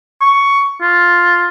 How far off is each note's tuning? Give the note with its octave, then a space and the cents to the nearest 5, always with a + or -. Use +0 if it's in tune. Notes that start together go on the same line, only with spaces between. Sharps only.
C#6 +10
F4 +5